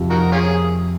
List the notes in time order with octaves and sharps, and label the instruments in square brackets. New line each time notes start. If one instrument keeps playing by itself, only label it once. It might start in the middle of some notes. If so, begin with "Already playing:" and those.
Already playing: [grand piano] F2 C3 F3
[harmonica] D#4 F#4 A#4
C#4 F4 G#4